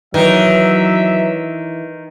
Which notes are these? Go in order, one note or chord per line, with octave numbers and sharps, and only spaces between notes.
D#3 E3 F#3 E5